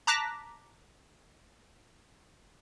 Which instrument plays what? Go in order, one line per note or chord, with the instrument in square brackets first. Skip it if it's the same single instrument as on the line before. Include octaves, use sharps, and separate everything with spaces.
[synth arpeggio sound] A5 A#5 D6 F#6 A#6 B6